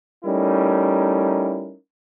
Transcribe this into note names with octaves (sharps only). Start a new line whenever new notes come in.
G3 A3 C#4 D#4 E4 A#4